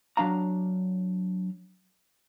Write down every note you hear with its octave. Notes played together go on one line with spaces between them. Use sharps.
F#3 D4 F5 A#5